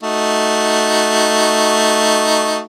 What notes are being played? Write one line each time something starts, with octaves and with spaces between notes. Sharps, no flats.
A3 D#4 F#4